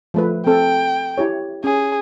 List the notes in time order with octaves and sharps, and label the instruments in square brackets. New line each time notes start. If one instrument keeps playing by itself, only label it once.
[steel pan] F3 A3 B4
[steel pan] C4 A4 [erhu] G5
[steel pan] E4 G4 C#5
[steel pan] C#4 [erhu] G#4